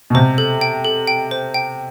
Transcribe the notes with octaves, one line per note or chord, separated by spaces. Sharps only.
B2
C3 C5
A4
G5
A4
G5
C5
G5